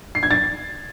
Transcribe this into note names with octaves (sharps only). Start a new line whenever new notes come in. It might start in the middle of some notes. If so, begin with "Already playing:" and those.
C7
G#6
A6